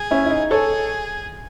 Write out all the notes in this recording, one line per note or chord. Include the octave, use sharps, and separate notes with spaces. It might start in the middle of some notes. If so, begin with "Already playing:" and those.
Already playing: G#4
C#4 E4
E4
D#4
G#4 A4 C#5